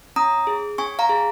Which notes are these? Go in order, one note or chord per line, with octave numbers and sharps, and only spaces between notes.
C#4 A#5 D#6
G#4
C#4 G#5 C#6
F5 A#5
G#4